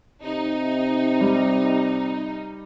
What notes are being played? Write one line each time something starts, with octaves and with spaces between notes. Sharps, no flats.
C3 D#4
G3